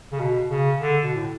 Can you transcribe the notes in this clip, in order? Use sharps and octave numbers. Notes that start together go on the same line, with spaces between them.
C#3
B2
C#3
D3
B2
A2